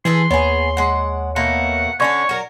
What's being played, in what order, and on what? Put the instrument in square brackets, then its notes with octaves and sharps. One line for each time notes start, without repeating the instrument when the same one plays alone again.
[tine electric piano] E3 [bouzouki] G#4 A4 B4 [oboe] C6
[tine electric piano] D#2 C#5 [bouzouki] B3 G#4
[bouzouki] G#3 F#5
[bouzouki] B2 A3 A#3 [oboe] F#5
[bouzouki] D3 C#4 D4 [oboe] C#5 [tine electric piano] D5 C#6 G#6
[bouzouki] F#3 A#4